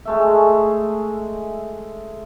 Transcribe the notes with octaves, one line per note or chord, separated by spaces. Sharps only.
G#3 A3 E5